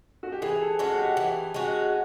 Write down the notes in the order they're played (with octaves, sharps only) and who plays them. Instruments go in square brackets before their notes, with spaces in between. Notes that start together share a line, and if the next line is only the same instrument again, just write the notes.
[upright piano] F#4
G4
[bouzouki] E3 [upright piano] G#4
[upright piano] A4
[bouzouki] G#3 C#4 F#4 [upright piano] A4
[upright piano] G4
[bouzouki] E3
G#3 C#4 F#4